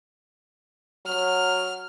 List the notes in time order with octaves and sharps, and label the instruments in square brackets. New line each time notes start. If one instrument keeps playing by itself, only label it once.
[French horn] F#3 [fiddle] F6